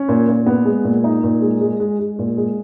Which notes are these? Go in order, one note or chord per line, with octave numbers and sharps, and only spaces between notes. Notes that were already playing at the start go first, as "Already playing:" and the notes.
Already playing: C#4
A#2
A#2
B3
G#3
A#2
D#4
A#2
G#3
G#3
G#3
G#3
A#2
G#3